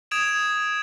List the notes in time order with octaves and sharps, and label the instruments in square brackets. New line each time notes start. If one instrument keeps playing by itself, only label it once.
[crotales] D#6 G#6 D7 E7 F7